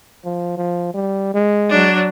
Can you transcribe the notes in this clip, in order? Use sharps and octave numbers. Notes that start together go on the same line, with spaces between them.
F3
F3
G3
G#3
F#3 D4